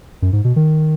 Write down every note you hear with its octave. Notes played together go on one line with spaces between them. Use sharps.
F#2
G#2
B2
D#3